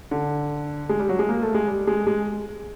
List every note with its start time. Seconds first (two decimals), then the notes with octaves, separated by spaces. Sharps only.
0.11 D3
0.89 G#3
1.00 G3
1.09 F#3
1.19 G#3
1.28 A#3
1.42 A3
1.54 G#3
1.67 G3
1.87 G#3
2.07 G#3